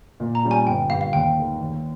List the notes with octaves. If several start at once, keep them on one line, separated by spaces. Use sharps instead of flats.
A#2
A#5
G3 C#4 F4
G#5
G1 G5
G2 G3 F5
F5
D#2 G5
D#3 G#3
D#2